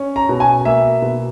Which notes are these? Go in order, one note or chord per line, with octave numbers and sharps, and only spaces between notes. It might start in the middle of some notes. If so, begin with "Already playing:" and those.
Already playing: C#4
A#5
B2
G#5
A#3 E5
B2